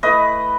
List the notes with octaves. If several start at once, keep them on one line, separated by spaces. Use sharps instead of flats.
A3 E4 B4 D#5